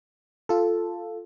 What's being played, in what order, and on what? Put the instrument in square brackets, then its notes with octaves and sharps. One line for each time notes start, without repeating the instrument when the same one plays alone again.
[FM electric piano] F4 A4